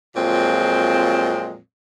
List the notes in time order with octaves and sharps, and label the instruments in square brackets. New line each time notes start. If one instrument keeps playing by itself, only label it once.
[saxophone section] F2 A#2 F#3 G#3 C4